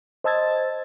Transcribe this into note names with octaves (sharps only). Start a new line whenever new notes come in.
C5 D#5 A5 E6 G#6 A6